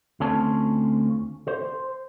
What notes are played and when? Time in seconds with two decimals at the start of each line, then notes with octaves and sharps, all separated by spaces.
0.20 D2 C4 C#4 F4 C#5 A5
1.48 C5